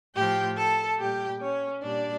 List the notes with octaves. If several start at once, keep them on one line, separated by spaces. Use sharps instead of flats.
A2 F3 G4 G5
A4 A5
A#2 G3 G4 G5
C#4 C#5
A#2 G3 D4 D5